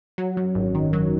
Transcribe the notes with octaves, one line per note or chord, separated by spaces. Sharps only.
F#3
F#2
G#1
D#3
F#3